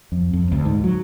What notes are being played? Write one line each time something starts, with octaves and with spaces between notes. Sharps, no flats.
F2
F2
D2
G#2
F#3